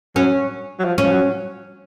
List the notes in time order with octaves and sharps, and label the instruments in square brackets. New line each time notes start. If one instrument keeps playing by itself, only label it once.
[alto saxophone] F#3 [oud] C#4
[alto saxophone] F#3
F3
[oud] C#4
[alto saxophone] F3
F#3